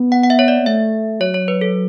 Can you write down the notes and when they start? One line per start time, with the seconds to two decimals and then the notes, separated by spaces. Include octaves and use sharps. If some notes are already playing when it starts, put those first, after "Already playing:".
Already playing: B3
0.12 F#5
0.23 F#5
0.30 E5
0.39 C#5
0.48 D5
0.62 B3
0.66 A3 E5
1.20 F#3 C#5
1.34 C#5
1.48 B4
1.61 A4